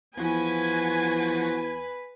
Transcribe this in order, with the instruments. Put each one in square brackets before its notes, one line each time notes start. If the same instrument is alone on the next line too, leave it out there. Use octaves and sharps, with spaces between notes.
[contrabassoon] E2 [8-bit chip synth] F3 F#4 B6 [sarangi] B4 [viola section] G#5